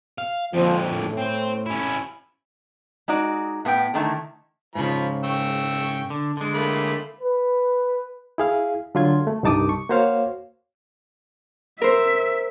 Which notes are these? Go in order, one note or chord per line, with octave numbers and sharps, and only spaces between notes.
F5
F2 D3 F3
A2
C4 C5
C#4 E4
G#3 D#4 F#4 D5
A2 B3 F4 G5
D3 D#3 A3 E4
G#2 C#3 F3 B5
G5 C#6 E6
D3
D3 G#3
A3 A#3 B5
B4
E4 G#4 F5
D3 F#3 F4 C6 G#6
A3
C2 G2 D#4 A5 D6 D#6
C#6
A#3 F#4 C5 C#5 F5
A#4 C5 E5